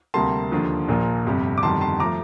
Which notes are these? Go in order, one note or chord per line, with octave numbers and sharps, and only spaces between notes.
D2 C3 G3 A#3 A5 C6
D#2 D3 F3
A#1 A#2 F3 A#3
G1 F2 C3 G3
D6
G1 F2 D#3 G3 A5 C6
A5 C6
F3 A3 A#5 D6